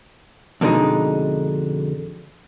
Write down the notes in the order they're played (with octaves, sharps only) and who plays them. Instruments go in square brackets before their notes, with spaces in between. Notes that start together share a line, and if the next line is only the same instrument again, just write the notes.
[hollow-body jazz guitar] F2 B2 D3 G#3 D#4